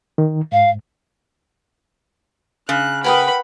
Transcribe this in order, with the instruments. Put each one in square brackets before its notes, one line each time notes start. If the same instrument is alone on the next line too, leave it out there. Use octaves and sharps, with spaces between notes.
[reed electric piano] D#3
[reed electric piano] G#2 [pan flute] F5
[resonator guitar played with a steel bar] C#3 [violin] F#6
[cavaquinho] A#4 G5 D#6 [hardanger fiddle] B4 B5 [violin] F#5